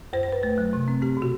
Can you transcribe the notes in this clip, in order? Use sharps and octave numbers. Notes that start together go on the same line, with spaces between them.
F#2 C5
C5
F#2 B4
A3 B4
F#3
C3
C4
C4 G4
B2
F#4